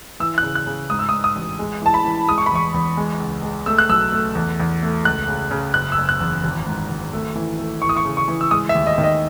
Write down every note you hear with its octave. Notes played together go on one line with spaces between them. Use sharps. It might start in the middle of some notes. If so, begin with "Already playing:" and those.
E3 E6
F#6
C#3
F#6
C#3
G#2 D#6
E6
D#6
G#2
D#6
A1
G#3
E3 A5
B5
E3
G#3 D#6
C#6
B5
E2 C#6
E2
G#3
C#2
G#3
A3 E6
F#6
B1 E6
A3
E2
E2
A3
C#2 F#6
C#3
C#3
F#1 F#6
E6
F#1
F#6
E2
G#1
G#2
G#1
A3
E3
A3
E3 C#6
D#6
C#6
C#3
C#6
E3
E6
G#3 D#6
E5
D#2
D#5
D#3
D#5